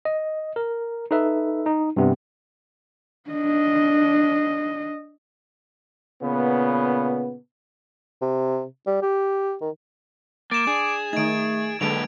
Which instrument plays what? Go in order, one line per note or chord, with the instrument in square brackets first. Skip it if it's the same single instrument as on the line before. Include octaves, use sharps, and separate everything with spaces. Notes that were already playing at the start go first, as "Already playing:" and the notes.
[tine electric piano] D#5
A#4
D#4 A4 B4 E5
D#4
G2 C3 B3
[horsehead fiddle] D4 D#5
[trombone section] A#2 C#3 B3
[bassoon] C3
G3
G4
D#3
[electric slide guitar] A#3 [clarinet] D6 [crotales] A6 E7
[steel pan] D4 [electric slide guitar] G#4
[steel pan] D#3 D#4 [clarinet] A3 [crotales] G#6 D7
[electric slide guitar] F#2 A#3 B4 [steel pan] D3 G#3 A4 [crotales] D7 F7